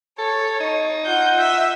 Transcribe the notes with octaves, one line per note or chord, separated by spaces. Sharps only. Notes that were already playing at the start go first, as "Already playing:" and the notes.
A4 C#5
D#4
F4 F#5 G6
E5